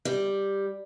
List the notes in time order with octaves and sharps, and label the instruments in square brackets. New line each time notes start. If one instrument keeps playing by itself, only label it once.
[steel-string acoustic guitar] G3